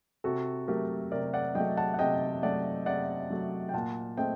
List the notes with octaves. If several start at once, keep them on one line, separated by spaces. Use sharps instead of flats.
C3 F#4 A4
F#3 A3 G4 A#4
C3 A#4 D5
D5 F#5
F#3 A3 D#5 G5
F#5 A5
F#5
C3 D#5 G5
F#3 A3 D5 F#5
C3 D5 F#5
F#3 A3
G5
A#2 F#5 A5
A3 C4 D#5 G5